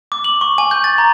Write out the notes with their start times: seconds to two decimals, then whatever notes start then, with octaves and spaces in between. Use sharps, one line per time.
0.12 D6
0.24 F#7
0.41 C#6
0.58 G#5
0.71 G6
0.84 A6
0.98 A#5